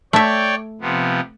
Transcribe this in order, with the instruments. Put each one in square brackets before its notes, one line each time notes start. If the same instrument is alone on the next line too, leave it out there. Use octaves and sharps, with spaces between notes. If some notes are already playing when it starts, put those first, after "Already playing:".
[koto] A3 E5 [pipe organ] C#5 D5 G5
[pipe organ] C3 F3 B3